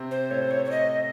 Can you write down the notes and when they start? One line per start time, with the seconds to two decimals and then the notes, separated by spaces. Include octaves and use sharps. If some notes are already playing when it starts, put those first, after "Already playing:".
Already playing: C3 C4
0.11 C5
0.31 A2 A3 C#5
0.42 C5
0.51 C#5
0.65 C#5
0.71 D#5